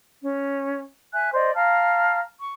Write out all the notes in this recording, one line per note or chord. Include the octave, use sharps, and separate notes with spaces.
C#4
E5 G#5 F#6
C5 D5 D#5
F5 A5 A#5 F6
C#6